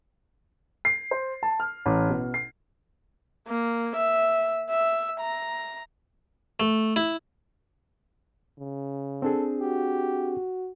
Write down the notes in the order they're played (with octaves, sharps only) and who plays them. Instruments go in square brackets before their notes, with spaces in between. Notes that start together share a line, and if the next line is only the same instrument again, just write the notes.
[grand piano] C7
C5
A5
F6
A1
B2
C7
[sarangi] A#3
E5
E5
A#5
[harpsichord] A3
E4
[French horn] C#3
[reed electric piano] C4 D4 G#4 [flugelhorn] A4
[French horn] F#4 [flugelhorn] G4